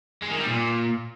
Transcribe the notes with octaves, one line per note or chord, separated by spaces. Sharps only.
G#3
D#3
G3
A#2